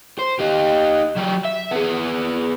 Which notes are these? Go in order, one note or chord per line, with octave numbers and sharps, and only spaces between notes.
C5
D#4 G4
F#3 G4
E5
B3 G#4